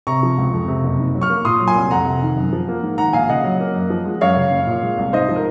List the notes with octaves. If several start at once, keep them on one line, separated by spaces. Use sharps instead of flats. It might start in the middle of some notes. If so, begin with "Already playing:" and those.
C3 A#5 C#6
F3
C#2
F2
C3
F#1
G#2
F#3
C#6 F6
A#3
A#2 C6 D#6
F#3
G#5 C6
C2
F2 F#5 A#5
C3
D#3
F#2
F3
A#3
G#2
D#3 F#5 A#5
A#1 F5 G#5
C#3 D#5 F#5
F#3
A#3
F#2
F3
G#3
F#2 C#5 F5
C#3
F#1
A#2
G#3
C2
G#2 C5 D#5
F3
A#4